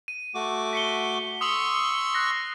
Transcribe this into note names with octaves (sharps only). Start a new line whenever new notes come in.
D#7
A3 F#4 D6
B6 C#7 G7
C6 C#6 D#6 E6 F#7
F#6 A#6 C7